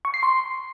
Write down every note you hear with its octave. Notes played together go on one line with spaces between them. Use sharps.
C#6
C7
C6